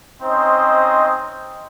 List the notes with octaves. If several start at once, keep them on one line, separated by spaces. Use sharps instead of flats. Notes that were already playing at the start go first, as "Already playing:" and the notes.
C4 C#4 D#4 C5 D#5